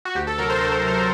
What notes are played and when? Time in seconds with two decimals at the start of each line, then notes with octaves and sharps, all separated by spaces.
0.05 F#4
0.15 D2 G4
0.27 A4
0.38 C3 F#3 A#4
0.50 C5
0.61 D2
0.84 C3 F#3 A#4
0.98 C5